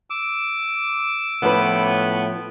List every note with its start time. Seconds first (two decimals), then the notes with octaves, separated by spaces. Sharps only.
0.10 D6 E6
1.43 A2 F3 B3 C#4 B4